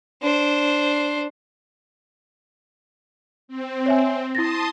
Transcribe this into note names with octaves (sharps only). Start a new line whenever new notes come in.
D4 C5
C4
C#5 E5 G#5
E4 A5 C6 D#6 A6 A#6